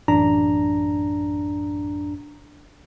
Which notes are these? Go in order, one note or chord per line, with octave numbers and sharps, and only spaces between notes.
A1 F#2 D4 A#5